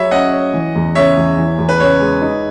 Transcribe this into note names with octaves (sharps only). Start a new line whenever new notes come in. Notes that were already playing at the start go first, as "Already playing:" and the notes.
Already playing: F#3 G#4 C#5 E5 B5
C#4 D#5 F#5
C#5
E3
E2
C#3 C#5 E5
E2
E3
E2
B4
C#3 C#5
G#3
D#4